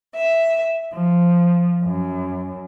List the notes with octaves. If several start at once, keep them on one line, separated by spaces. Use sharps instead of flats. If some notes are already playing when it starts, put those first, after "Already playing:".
E5
F3
F#2